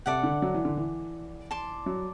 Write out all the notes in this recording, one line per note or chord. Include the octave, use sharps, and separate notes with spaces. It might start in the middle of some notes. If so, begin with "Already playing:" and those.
C3 A4 D5 F#5
D3
F#3
E3
D3
E3
D5 A5 C6
F#3